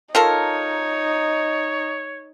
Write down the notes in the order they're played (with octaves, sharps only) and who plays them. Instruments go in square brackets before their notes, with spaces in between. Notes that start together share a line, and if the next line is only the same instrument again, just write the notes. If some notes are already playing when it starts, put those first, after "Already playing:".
[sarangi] D#4 [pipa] F4 A4 A#4 [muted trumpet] C#5